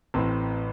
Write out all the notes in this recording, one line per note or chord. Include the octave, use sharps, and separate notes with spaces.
A1 A2 C4